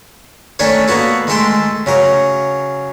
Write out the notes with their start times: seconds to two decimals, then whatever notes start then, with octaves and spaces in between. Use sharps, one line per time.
0.59 D#3 A3 C#4 D4 A4 C#5
0.88 A#3 B3 F#4 A4
1.27 D#3 G#3 A3 A4 G5 C6
1.86 C#3 F#3 A#4